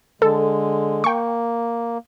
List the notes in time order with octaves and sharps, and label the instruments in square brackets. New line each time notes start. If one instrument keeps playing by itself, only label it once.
[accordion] D3 G#3 [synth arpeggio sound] A4
[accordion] A#3 [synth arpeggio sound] G5 C#6